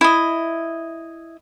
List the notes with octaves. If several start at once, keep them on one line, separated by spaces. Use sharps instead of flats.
E4 D#5